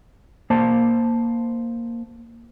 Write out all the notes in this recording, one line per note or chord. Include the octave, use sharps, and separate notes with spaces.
A#3 C5 A5